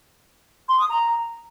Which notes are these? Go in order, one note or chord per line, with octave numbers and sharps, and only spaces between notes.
C6
D#6
A#5